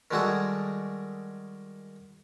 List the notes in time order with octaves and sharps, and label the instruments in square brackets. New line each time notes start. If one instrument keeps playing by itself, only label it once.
[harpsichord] D#3 G3 G#3 F#4 G#4 A4